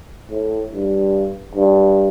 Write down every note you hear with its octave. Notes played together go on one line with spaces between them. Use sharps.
A2
G2
G2